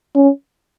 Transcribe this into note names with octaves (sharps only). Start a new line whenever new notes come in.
C#4